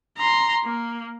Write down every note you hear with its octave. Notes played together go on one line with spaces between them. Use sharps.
A#5 C6
A#3